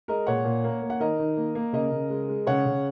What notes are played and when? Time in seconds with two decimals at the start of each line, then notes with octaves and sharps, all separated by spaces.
0.08 G#3 A#4 D#5
0.27 A#2 C#5 F#5
0.45 A#2
0.64 A#3
0.82 A#3
0.90 F#5
1.00 D#3 A#4 D#5
1.19 D#3
1.37 A#3
1.55 A#3
1.73 C#3 A#4 D#5
1.92 C#3
2.10 G#3
2.29 G#3
2.47 C#3 C#5 F#5
2.65 C#3